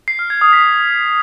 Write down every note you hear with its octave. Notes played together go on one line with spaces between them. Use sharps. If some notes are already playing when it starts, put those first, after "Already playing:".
C7
F6
G#6
D#6
B6